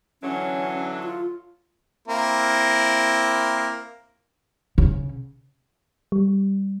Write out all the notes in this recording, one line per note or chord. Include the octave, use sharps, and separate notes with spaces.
D3 E3 F#3 C#4
F4
A#3 C4 E4
C#3
G3